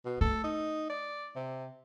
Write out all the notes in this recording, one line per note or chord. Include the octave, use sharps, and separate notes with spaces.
B2
A3 A4
D#4
D5
C3